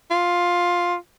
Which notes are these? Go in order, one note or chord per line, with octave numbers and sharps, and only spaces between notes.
F4